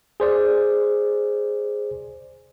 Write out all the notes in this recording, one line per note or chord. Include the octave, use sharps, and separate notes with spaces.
G#4 C5 D5